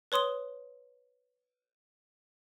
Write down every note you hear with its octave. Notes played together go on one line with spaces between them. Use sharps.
B4 C#5 C6 D#6 G7